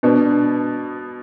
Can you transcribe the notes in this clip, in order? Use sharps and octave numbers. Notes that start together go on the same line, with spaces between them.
B2 B3 D4